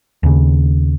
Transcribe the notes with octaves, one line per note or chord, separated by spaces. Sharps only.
D#2 C#3